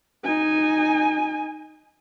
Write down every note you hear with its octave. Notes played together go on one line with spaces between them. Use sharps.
D#4 G#5